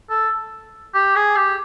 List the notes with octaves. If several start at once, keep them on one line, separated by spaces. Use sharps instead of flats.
A4
G4
G#4
G4